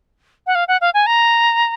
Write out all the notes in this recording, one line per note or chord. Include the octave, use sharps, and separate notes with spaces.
F#5
F5
F#5
F5
G#5
A#5